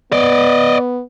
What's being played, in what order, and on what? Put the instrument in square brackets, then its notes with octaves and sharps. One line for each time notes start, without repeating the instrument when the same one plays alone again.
[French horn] B3 [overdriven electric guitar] D5 D#5